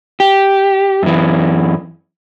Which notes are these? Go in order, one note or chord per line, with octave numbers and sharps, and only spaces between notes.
G4
F#2 E3